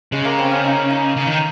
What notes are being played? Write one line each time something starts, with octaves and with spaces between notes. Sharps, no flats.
C#3 G#3
A#3
C4
C#4
D#4
D#4
C#3
D#3